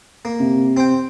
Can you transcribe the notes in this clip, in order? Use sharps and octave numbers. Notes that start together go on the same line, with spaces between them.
A#3
C3
C4 G5